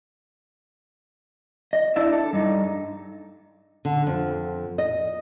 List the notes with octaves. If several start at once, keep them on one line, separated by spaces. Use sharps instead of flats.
D#5
D4 E4 D5 E5
A4
G2 D#4
D3
F2
D#5